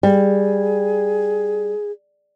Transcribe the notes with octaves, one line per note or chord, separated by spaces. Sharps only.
G3 G#4